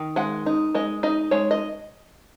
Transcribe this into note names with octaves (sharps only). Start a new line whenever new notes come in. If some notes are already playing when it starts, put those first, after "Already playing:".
Already playing: D#3
G#3 F#5
D#4
G#3 D#5
D#4 D#5
G#3 C#5
D#5